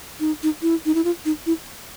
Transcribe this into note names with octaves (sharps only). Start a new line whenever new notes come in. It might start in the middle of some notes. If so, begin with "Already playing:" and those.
D#4
D#4
E4
D#4
E4
F4
D#4
E4